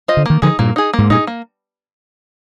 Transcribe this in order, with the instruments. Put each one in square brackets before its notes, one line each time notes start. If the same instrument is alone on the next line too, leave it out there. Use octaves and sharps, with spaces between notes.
[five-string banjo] F4 C5 D#5
[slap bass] D3
[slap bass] D#3 [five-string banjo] A#3
[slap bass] D3 F3 [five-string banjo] D#4 G#4
[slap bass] G2 A#2 [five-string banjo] A#3
[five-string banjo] D#4 G#4
[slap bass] G#2 [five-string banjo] A#3
[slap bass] G2 A#2 [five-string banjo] D#4 G#4
[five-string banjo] A#3